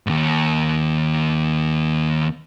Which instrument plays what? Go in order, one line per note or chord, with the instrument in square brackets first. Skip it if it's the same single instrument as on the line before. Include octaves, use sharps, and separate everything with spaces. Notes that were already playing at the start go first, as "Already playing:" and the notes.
[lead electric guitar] D#2 G#2